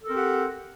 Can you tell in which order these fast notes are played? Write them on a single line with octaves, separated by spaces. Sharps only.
A4 A#4 C4 G4 F#5